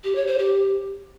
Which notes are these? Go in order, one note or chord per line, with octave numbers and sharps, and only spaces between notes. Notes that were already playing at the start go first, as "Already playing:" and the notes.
G4
C#5
C5
G4